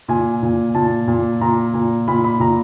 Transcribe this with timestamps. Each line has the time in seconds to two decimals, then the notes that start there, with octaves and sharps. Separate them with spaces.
0.08 A#2 G#5
0.42 A#2
0.75 A#2 A5
1.08 A#2
1.41 A#2 A#5
1.74 A#2
2.08 A#2 B5
2.24 B5
2.40 A#2 A#5